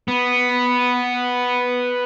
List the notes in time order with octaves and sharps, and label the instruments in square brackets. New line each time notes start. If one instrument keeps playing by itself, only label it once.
[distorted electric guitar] B3